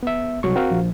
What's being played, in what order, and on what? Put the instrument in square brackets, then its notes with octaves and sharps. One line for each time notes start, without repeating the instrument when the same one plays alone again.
[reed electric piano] B3 E5
C2 F#3 C#6
[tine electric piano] C4 [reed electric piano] F#4 A#4 F5
[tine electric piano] A#1 A#2 F3